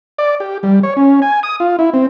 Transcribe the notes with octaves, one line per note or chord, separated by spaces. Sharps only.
D5
G4
G3
C#5
C#4
G#5
D#6
F4
E4
C4